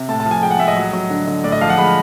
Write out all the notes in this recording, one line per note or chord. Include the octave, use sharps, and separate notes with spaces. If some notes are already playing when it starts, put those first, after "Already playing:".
Already playing: C3
A2 A5
A5
F3
G#5
G#3 G5
F#5
A2 E5
D#5
F#3
F#3
D3
D3
A2 D5
D#5
F3 F5
F#5
G#3 B5